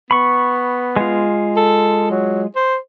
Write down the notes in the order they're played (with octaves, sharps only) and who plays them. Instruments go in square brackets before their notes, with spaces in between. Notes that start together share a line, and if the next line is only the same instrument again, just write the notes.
[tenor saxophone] B3 [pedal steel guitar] B5 C#6
[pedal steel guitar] G#3 F4
[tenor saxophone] A4
F#3
C5